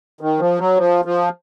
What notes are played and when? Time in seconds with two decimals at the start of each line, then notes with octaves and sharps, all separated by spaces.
0.21 D#3
0.39 F3
0.59 F#3
0.77 F3
1.05 F3